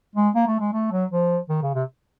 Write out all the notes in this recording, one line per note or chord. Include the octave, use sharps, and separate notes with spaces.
G#3
A#3
A3
G#3
A3
F#3
F3
D#3
C#3
C3